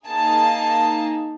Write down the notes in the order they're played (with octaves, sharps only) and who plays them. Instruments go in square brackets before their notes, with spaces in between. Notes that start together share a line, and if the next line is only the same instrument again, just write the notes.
[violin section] A#3 D#4 G#4 A5